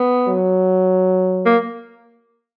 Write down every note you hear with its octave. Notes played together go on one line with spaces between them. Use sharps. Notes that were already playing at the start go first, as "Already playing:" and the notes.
Already playing: B3
F#3
A#3